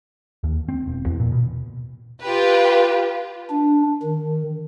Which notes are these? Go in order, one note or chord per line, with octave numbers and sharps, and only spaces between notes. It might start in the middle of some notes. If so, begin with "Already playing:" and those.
D#2
C4
E1
E2
A#2
B2
F4 G4 B4
D4
D#3